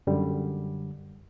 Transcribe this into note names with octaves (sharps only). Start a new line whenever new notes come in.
F#2 D3 G3